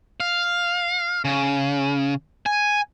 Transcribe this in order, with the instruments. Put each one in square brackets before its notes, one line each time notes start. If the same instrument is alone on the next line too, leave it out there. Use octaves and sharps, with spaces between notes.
[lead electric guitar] F5
C#3
G#5